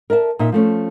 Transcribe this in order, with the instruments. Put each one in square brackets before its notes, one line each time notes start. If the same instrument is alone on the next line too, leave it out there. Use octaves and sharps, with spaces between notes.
[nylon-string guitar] A#4 D5 E5 A5
A#2 D#4 E5
F3 A3 C#4